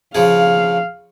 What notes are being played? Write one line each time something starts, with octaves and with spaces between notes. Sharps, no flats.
C#3 F3 G#4 F5